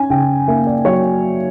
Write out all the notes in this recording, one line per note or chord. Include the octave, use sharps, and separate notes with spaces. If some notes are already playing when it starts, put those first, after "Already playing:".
Already playing: C#4 G#5
C#3 G5
A#3 E5
D5
F#3 C#5